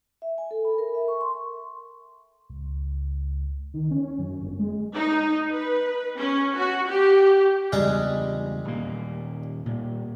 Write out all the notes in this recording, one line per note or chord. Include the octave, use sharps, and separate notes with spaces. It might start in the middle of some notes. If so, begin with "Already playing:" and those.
E5
G#5
A4
B5
A#4
E5
C#6
C6
C#2
D#3
C#4
F#2
G1
G#3
D#4
B4
C#4
F#4
G4
E2 G2 C#3 G3 G#3 D#5
D#1 A#3
A#2 G3